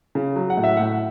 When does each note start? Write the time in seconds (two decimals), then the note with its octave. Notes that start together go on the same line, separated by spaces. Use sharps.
0.15 C#3
0.36 F#3
0.50 F#5
0.57 A2
0.64 E5
0.77 A2 F#5